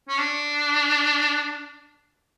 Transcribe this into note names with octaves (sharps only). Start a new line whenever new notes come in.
C#4
D4